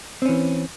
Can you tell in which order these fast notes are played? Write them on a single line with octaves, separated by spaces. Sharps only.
C4 C#4 E3